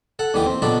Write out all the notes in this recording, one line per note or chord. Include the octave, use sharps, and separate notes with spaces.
A4 F#5
D#2 D3 E3 G4 G5 D6
C4
A#1 B2 D4 A4 B5 D6